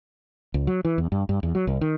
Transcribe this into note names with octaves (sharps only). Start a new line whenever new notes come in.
C#2
F#3
E3
E2
G2
G2
E2
F#3
C2
D#3